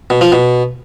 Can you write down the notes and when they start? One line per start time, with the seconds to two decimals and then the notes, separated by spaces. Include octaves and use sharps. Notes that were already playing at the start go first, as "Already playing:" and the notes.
0.10 B2
0.21 F3
0.32 B2